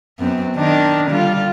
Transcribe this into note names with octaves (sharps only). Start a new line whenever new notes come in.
F#2 B3 C4
D#3 D4 D#4
D3 G3 F4